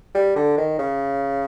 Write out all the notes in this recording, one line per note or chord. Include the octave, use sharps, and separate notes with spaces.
G3
D3
D#3
C#3